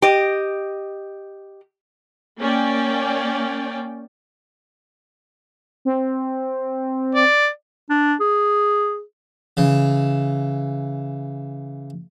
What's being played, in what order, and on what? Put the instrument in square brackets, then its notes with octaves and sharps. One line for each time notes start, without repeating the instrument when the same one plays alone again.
[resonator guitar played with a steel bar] G4 D#5
[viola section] A#3 C#4 D5 G5
[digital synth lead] C4
[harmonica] D5
[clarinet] D4
G#4
[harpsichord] C#3 E3